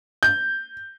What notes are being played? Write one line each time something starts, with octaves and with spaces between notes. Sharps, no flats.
G6